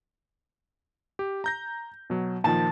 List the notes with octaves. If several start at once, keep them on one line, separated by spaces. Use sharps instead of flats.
G4
A#5 G6 A#6
B2 F#3
A#2 D#3 F3 A5